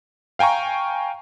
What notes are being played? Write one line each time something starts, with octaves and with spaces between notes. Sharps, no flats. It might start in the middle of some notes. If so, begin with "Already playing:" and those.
F5 G5 G#5 A#5 C#6